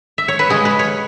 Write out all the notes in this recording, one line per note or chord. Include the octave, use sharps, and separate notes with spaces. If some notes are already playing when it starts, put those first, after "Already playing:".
E5
C#5
B4
C#3 G#3 C#4 G#4
B4
C#5